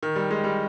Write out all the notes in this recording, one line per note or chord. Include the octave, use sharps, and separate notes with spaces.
D#3
G3
G#3
G3